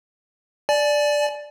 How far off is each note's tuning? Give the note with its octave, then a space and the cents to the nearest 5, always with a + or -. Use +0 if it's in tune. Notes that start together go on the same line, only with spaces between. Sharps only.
D5 +0 G#5 +35